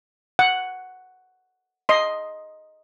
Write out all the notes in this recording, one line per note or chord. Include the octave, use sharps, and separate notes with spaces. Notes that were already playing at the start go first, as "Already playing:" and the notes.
F#5
D#5 C6